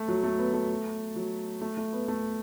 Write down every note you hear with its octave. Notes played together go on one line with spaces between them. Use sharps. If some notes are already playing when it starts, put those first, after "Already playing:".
Already playing: A3
F#3
A3
B3
A3
F#3
A3
A3
B3
A3